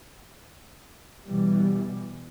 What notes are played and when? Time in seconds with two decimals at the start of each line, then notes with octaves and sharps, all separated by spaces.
1.25 B2 E3 G3